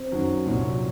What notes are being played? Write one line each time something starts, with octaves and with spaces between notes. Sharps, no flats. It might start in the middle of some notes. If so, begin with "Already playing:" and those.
Already playing: C4
F#2 D#3 F#3
C2 A#2 F#3